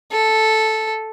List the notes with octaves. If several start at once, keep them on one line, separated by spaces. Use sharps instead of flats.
A4